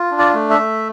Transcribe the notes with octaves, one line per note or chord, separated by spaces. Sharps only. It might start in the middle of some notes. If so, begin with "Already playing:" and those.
Already playing: F4
D4
D5
A3
E5
A3